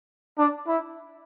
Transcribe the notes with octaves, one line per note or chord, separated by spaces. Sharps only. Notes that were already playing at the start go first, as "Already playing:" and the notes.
D4
E4